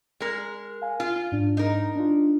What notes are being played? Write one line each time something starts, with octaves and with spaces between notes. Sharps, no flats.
G#3 A#4
F5 G#5
F4
G#2 D4
D#4 A#4
D4 F4